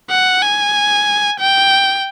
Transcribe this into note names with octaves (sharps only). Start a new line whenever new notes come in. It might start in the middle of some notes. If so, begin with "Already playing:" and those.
F#5
G#5
G5